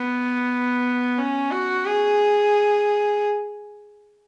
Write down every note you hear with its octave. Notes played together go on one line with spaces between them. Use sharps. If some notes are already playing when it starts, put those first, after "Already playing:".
Already playing: B3
C#4
F#4
G#4